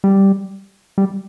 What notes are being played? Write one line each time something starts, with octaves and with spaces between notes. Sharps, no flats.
G3
G3